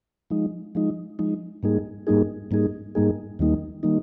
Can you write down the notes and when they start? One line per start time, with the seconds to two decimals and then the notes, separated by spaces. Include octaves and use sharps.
0.30 F3 G#3 D#4
0.75 F3 G#3 D#4
1.19 F3 G#3 D#4
1.63 G#2 G3 A#3 D#4 G#4
2.07 G#2 G3 A#3 D#4 G#4
2.51 G#2 G3 A#3 D#4 G#4
2.95 G#2 G3 A#3 D#4 G#4
3.39 D#2 D#3 G3 A#3 D#4
3.83 D#3 G3 A#3 D#4